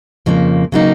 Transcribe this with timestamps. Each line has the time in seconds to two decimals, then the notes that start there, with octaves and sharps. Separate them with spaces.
0.26 F2 C#3 F3 A#3
0.72 C#3 F#3 A#3 D#4